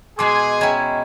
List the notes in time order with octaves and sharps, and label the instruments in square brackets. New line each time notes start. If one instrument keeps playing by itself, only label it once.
[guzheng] B2 G#3 [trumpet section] G#4 G#5 [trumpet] C6 [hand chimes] D6
[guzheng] G#3 E4 [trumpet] C#4 [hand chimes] G5 A#5 G#6